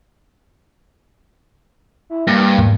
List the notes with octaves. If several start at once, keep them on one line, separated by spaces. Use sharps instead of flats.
E4
G2 A#3 A#6
E2 G#2 B2